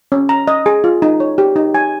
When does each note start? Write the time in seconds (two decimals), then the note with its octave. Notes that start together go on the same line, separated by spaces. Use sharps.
0.12 C#4
0.29 A#5
0.48 D#5
0.66 G#4
0.84 F4
1.02 D#4
1.20 C#5
1.38 G4
1.56 D#4
1.74 G#5